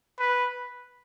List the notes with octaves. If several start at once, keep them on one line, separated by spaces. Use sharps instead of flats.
B4